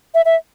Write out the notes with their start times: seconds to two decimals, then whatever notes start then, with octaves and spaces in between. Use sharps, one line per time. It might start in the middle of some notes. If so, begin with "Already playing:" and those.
0.15 E5
0.25 E5